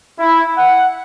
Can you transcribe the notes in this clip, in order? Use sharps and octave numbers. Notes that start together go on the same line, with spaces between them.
E4
F#5